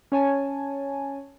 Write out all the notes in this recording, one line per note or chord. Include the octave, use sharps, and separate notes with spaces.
C#4 C#5 G#5 A5